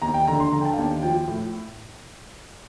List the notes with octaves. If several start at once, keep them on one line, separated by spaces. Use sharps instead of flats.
D#2 A#5
G5
D3 A#5
C6
D3 A#5
G5
A5
F5
D#2 G5
F3 G5
A2